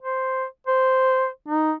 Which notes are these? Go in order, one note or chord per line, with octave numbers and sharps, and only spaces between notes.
C5
C5
D#4